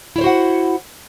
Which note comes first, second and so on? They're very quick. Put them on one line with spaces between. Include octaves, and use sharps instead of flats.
E4 C#5 C5 F#4 F#5